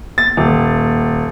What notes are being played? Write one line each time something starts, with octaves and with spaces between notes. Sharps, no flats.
A6
D#1